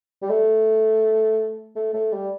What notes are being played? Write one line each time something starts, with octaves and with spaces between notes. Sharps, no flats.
G3
A3
A3
A3
G3